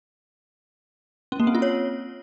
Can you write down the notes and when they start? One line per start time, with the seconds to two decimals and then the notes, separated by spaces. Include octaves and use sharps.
1.32 C#4
1.40 A#3
1.47 C4
1.55 F4
1.62 C#5